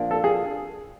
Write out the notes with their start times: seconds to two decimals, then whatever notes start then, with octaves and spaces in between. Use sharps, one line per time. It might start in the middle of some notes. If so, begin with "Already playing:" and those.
Already playing: A#2 F3 A#3 D4
0.11 A4
0.24 G#4